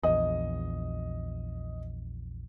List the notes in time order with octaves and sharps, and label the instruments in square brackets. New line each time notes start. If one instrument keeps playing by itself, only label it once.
[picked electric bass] A#1 E2 [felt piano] D#5